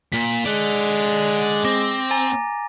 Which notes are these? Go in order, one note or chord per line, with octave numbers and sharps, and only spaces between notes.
A#2 B6
G#3 D5 F#5
C4 D6 A#6
G#5 A#5 A6